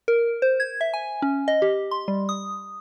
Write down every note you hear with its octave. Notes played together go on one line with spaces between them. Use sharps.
A#4
C5
G#6
E5
G#5
C#4
D#5
G4
C6
G3
D#6